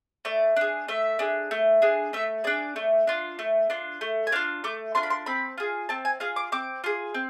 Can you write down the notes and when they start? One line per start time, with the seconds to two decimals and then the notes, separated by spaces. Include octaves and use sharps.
0.25 A3 D5
0.56 D4 G#4
0.88 A3 E5
1.19 D4 G#4
1.51 A3
1.82 D4 G#4
2.13 A3 E5
2.44 D4 G#4 D5
2.76 A3
3.07 D4 F4
3.39 A3
3.70 D4 F4
4.01 A3
4.27 G#5
4.32 D4 F4 F5
4.64 A3 D6
4.95 D4 F4 C6
5.03 B5
5.10 C6
5.26 C4 B5
5.58 F4 G#4
5.89 C4 A5
6.05 G#5
6.20 F4 G#4 F5
6.36 D6
6.52 C4 D6
6.84 F4 G#4
7.14 C4